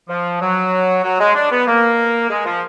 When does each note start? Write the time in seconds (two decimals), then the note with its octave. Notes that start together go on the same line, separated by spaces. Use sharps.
0.09 F3
0.41 F#3
1.03 F#3
1.20 G#3
1.35 D4
1.51 B3
1.67 A#3
2.30 G#3
2.45 F3